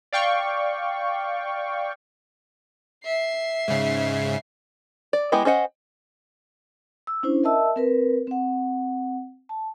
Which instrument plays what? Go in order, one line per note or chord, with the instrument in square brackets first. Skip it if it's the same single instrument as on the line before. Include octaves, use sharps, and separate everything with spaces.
[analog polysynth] D5 F5 G5 C#6
[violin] E5 C7
[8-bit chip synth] G#2 C#3
[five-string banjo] D5
G#3 B3 E4 G4 D#5
C#4 C5 D#5 F#5
[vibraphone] E6
C#4 D4 E4 C5
A#4 D#5 E5 A5 E6
C4 A#4 B4
C4 F#5
A5